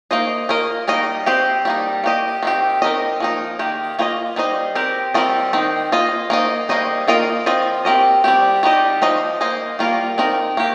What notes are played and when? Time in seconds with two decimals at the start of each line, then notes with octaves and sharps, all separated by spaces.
0.11 A#3 D#4 C5 D#5
0.49 A#3 F4 A#4 D#5
0.88 G3 A#3 D#4 A#4 D#5
1.26 C4 G4 C5 D#5
1.65 G3 A#3 D#4
2.04 A#3 G4 D#5
2.43 D#3 C4 G4
2.82 C4 D#4 A#4 D#5
3.20 F3 A#3 D#4
3.59 D#3 A#3 G4
3.99 A#3 F4 C5 D#5
4.36 G3 D#4 C5 D#5
4.75 C4 G4 A#4
5.14 G3 C4 F4 A#4 D#5
5.53 D#3 C4 D#4 C5
5.92 A#3 F4 D#5
6.30 A#3 D#4 C5 D#5
6.69 G3 A#3 D#4 C5 D#5
7.08 D#3 A#3 F4 A#4 D#5
7.46 F3 C4 F4 D#5
7.85 C4 G4 A#4 D#5
8.24 G3 C4 G4
8.63 G3 D#4 G4 D#5
9.02 F3 D#4 C5 D#5
9.41 A#3 D#4 C5 D#5
9.79 G3 A#3 F4 A#4
10.18 D#3 C4 D#4 A#4
10.57 A#3 G4